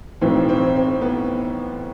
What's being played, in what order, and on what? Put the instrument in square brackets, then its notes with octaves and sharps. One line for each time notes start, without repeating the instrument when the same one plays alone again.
[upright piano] B1 A2 E3 C4
C4
C4
B3